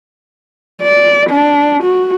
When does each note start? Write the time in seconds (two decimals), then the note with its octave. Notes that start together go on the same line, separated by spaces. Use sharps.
0.82 D5
1.30 D4
1.83 F#4